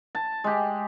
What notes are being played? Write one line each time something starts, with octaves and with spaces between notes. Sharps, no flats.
A5
G#3 G4